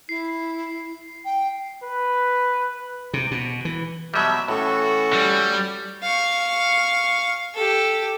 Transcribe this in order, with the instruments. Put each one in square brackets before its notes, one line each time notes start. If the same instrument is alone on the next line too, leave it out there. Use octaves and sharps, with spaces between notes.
[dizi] E4 [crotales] C7
[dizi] G5
[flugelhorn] B4
[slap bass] C3
B2
E3
[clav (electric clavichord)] B2 F#3 G3 [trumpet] E5
[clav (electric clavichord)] A2 [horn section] E3 C#4 A4 [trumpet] F#4
[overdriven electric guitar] G3
[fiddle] F5 C#6
G4 A4